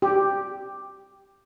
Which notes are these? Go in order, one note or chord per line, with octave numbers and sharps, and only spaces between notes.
G4